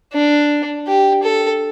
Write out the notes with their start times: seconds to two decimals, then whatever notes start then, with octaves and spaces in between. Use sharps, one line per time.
0.13 D4
0.87 G4
1.23 A4